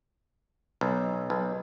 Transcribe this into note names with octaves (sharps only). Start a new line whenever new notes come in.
B1
B1